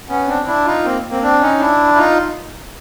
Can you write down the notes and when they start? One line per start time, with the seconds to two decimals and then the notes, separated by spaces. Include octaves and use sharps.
0.09 B3 C#4
0.27 C4 D4
0.46 D4 E4
0.66 D#4 F4
0.84 A#3 C4
1.10 A#3 C4
1.22 C4 D4
1.41 C#4 D#4
1.60 D4 E4
1.95 E4
1.98 D#4 F4